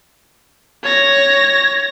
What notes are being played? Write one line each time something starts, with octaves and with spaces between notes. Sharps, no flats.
C#5 A#6